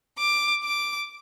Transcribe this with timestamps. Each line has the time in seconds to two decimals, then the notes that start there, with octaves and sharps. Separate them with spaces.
0.18 D6
0.64 D6